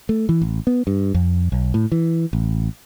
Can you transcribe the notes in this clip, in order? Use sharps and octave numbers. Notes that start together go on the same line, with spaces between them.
A3
E3
A1
B3
G2
F2
B1
A2
E3
A1